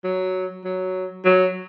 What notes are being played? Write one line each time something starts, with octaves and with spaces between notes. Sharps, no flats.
F#3
F#3
F#3